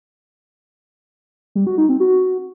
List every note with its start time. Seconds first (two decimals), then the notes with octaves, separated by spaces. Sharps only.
1.55 G3
1.67 F#4
1.78 D#4
1.89 C4
2.00 F#4